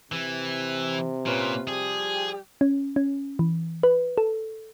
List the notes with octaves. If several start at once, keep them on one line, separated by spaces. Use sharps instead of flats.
C3 E3
A#2 C#4 F4 B4
F3 G3 G4 G#4
C#4
C#4
E3
B4
A4